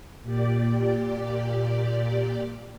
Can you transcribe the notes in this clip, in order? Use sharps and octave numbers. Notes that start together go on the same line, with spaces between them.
A#2 G4 D5